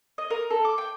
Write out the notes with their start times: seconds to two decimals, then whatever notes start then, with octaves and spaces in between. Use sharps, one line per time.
0.18 D#5
0.30 A#4
0.50 A4
0.65 D6
0.78 G5